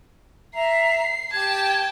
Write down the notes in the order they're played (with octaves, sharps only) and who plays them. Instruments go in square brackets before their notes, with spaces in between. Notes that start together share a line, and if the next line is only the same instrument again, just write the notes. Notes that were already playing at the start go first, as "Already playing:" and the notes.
[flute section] E5 A#5 [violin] C7
[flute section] G4 G#6 [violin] G5 A5